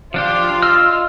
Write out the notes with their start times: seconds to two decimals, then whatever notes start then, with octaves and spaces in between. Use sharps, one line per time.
0.14 F3 D4 F4 G4
0.63 D#5 E6 F6